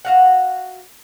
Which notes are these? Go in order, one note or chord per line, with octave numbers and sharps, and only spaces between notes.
F#4 F5 F#5